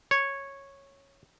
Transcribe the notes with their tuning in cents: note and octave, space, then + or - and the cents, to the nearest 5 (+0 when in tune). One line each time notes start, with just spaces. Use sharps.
C#5 -10